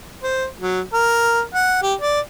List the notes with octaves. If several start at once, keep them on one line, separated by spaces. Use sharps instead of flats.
C5
F#3
A#4
F#5
G4
D5